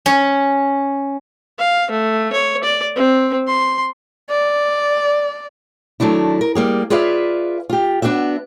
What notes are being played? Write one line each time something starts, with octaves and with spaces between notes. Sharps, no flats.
C#4
F5
A3
C#5
D5
C4
C6
D5
D#3 F#3 A3 D4 E4
A#4
G3 A#3 G#4
F4 G#4 B4 D5 E5 F5
F4 G4
B3 D4 F#4 G4 E5